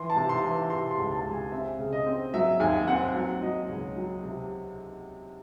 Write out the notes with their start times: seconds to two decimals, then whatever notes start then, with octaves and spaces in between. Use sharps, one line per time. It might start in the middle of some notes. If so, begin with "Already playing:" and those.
Already playing: E3 C6
0.10 A5
0.16 C3
0.29 C6
0.43 E3
0.70 C3 C6
0.91 C6
0.98 C#2
1.12 A5
1.25 C#2
1.32 G#5
1.52 C4 E5
1.78 C#3
1.92 D#5
2.06 C4
2.34 F#3 E5
2.60 D#2 G#5
2.87 C4 F#5
3.15 F#3 F#5
3.41 F#3 D#5
3.69 C#2 C#5
3.96 F#3
4.23 C3